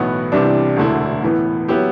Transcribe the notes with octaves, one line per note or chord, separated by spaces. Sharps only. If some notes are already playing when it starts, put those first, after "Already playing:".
Already playing: B1 A2 E3 B3 F#4
C2 C3 E3 G3 D4
E1 D2 D3 A3 E4
A2 E3 B3
F#3 B3 E4 G4